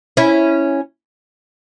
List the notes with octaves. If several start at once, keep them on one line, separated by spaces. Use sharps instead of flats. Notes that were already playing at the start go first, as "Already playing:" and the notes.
C#4 E4